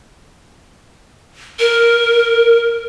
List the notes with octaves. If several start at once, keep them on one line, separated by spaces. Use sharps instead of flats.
A#4